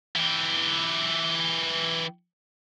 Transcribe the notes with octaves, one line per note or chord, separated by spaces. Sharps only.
E3 G4